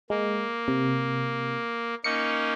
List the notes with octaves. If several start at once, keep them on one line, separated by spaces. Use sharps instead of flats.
G#3 A#3
C3
A#3 C#4 D#4 C#7